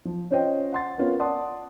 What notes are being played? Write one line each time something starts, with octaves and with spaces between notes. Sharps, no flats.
F3
C#4 F4 C5 C#5 D#5 G5
F#5 C6 A6
B3 C#4 F4 A#4 B4
D5 F#5 A5 C6 D#6